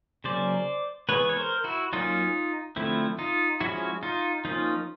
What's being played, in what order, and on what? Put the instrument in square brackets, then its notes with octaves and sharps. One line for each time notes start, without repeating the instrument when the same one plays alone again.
[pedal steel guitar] C#3 F#3 A#3 C#4 C5 D5
E3 G#3 B3 B4 C#5
C#5
A#4 C5
E4 F#4
F#3 A#3 C#4 D#4 F4
D3 F3 A3 C4 E4
D#4 F4
F3 G#3 C#4 E4 F#4
D#4 F4
F3 A#3 C#4 D#4 F4